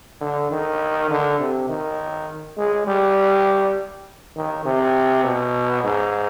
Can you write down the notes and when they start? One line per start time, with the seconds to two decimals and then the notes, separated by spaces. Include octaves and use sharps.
0.21 D3
0.51 D#3
1.11 D3
1.40 C3
1.69 D#3
2.58 G#3
2.87 G3
4.36 D#3
4.65 C3
5.24 B2
5.84 G#2